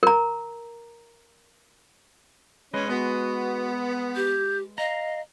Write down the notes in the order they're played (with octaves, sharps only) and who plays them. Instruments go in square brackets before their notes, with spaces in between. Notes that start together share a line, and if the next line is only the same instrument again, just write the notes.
[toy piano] A#4 A#5
[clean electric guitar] G#3 B4 D#5 [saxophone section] C#4
[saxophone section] B3 [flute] F#4
[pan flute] G4 [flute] G6
[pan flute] D#5 [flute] F5 [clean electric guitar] A#5